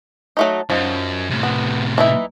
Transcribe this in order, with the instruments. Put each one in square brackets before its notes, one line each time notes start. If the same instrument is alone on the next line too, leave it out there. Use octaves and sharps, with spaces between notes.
[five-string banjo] F#3 A3 D#4
[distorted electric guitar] F#2 [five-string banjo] F3 D#4
[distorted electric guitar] A2 C3
[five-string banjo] B3
E3 D#4 E4